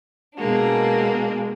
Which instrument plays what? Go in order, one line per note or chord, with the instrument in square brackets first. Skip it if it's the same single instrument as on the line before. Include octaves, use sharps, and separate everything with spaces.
[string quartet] B2 G#3 A#3 D4